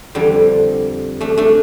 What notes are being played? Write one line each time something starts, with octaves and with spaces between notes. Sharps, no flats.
F2 D3 G3
A3 D4
A3 D4